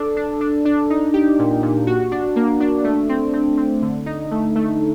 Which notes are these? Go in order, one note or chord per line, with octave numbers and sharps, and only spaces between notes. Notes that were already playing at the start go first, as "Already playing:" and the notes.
Already playing: D4 A4
D4
D4
D4
D#4
G4
A#2
A#2
F#4
D4
A#3
D4
A3
C4
C4
C4
D3
D#4
A3
A3